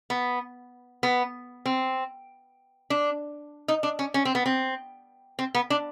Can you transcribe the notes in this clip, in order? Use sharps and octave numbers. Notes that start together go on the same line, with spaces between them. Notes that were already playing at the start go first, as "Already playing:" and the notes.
B3
B3
C4
D4
D#4
D4
C#4
C#4
C4
B3
C4
C4
B3
D4